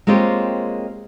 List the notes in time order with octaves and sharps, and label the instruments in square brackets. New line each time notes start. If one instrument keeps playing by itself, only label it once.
[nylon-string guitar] G#3 A#3 C4 F4 G4 C#5